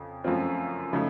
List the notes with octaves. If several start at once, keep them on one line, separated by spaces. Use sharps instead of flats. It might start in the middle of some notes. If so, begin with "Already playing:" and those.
Already playing: F2 C#3
F#2 F3 A3 C4 F4
C#3 F3 A3 D#4